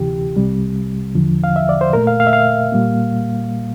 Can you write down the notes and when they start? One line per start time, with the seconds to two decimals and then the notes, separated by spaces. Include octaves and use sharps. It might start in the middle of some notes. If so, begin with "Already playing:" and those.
Already playing: D2 C3 E3 G4
0.37 C2 C3 G3
1.15 E2 D3 F3
1.44 F5
1.56 E5
1.69 D5
1.81 C5
1.93 A#2 A3 A#4
2.07 F5
2.20 F5
2.27 E5
2.33 F5
2.72 A#2 G3 A#3